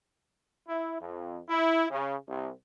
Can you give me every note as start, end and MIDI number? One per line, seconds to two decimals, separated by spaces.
0.68 0.97 64
1.01 1.40 41
1.49 1.87 64
1.90 2.16 49
2.29 2.50 36